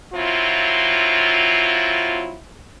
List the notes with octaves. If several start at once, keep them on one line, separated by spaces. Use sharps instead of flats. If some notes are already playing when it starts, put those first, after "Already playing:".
F#3 C4 E4 F4